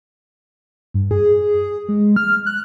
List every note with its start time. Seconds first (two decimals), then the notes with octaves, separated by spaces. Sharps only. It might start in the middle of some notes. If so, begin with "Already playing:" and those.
0.94 G2
1.11 G#4
1.89 G#3
2.16 F6
2.46 F#6